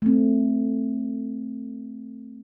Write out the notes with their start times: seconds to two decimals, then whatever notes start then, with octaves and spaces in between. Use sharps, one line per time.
0.02 A3 C4